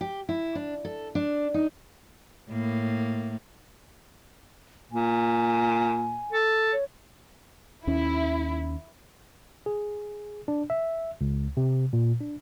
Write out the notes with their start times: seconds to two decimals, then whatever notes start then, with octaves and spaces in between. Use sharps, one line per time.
0.01 G4
0.29 E4
0.55 D4
0.85 A4
1.15 D4
1.54 D#4
2.50 A2 A#3
4.92 A#2 G#5
6.32 A4
6.72 C#5
7.87 D#2 D#3 C#4 E4
9.66 G#4
10.48 D4
10.70 E5
11.21 C#2
11.57 C3
11.93 A#2
12.20 D4